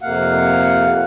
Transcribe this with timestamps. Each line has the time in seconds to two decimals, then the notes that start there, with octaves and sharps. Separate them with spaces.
0.01 F2 C3 A#3 F5 F#5